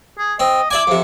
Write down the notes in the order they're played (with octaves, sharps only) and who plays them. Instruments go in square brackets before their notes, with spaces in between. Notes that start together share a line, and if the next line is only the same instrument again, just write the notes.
[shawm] G#4
[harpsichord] C4 [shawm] D#5
[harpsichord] E4 D5 G#5 [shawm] D6
[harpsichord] F2 C3